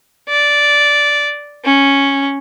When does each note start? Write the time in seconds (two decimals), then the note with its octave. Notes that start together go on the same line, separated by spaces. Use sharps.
0.29 D5
1.64 C#4